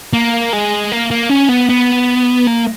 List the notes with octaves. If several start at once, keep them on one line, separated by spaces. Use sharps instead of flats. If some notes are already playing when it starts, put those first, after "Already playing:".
A#3
G#3
A#3
A#3
C#4
B3
B3
A#3